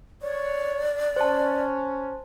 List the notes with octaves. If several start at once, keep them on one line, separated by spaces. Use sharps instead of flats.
C#5 D5
C#4 C5 A5